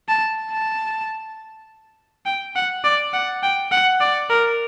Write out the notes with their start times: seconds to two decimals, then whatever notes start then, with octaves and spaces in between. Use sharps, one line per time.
0.08 A5
0.51 A5
2.26 G5
2.55 F#5
2.84 D5
3.13 F#5
3.42 G5
3.71 F#5
4.00 D5
4.30 A#4